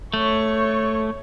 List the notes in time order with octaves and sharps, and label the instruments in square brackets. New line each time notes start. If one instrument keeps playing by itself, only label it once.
[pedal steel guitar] A3 [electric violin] C#5 C#6